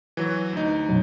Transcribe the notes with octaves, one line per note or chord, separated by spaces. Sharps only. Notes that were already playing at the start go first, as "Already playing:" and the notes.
E3 F#3
D2 D#4
F#2 B2 F#3